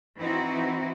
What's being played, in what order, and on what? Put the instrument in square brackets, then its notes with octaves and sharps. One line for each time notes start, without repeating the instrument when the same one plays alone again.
[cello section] E3 C4 D#4 E4 F#4